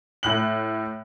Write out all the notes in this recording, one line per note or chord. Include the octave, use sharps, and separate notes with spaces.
A2 F#6 F#7